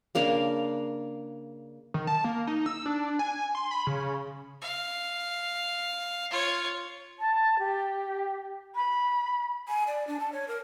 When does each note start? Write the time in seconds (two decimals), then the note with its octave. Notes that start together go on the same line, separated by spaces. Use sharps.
0.15 C#3 A#3 D4 F5
1.94 D#3
2.07 A5
2.24 A#3
2.47 D#4
2.66 E6
2.86 D4
3.19 G#5
3.55 C6
3.71 B5
3.87 C#3
4.61 F5
6.31 F4 C#5
7.19 A5
7.59 G4
8.75 B5
9.68 G#5
9.87 D5
10.07 D4
10.20 A5
10.32 C#5
10.48 A#4